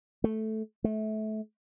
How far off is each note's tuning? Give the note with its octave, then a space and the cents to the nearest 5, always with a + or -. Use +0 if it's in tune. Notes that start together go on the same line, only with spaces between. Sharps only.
A3 -5
A3 -25